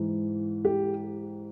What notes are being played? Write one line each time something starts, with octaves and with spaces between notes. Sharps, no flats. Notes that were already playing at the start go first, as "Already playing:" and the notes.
Already playing: G#2 E3
G4